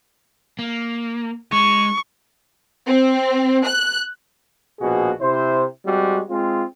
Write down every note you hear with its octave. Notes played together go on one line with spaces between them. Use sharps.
A#3
G#3 C#6
C4
F#6
A#1 B2 F#4 G#4
C3 E4 C5
G3 G#3 C4 F#4
G#3 C4 F4